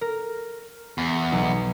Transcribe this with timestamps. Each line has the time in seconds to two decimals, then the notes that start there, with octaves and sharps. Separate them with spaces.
0.01 A#4
0.98 E2
1.32 B1